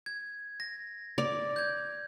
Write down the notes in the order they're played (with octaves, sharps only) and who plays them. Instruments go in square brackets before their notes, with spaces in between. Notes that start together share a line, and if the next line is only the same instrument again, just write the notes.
[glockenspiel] G#6
A#6
[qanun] D5
[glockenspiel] G6 G#6